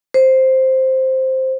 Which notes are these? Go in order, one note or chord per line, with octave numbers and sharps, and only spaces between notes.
C5